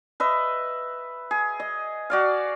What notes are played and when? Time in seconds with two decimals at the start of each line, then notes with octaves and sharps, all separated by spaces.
0.20 B4 D#5 E5
1.31 G#4
1.60 D#5
2.10 F#4 D5 F5